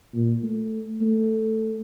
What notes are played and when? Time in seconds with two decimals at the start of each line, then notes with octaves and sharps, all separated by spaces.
0.14 A#2
0.43 A3
1.01 A3